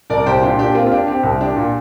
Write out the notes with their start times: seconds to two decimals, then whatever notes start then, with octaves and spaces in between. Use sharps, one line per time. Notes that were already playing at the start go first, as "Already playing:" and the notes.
0.10 C2 A#4 D5
0.26 C2 G4 C5
0.42 A#2 D4 G4
0.58 A#2 D4 G4
0.75 A#3 C4 F4
0.87 F4
0.91 D4 G4
1.07 C4 G4
1.23 C2
1.41 D4 G4
1.57 A#2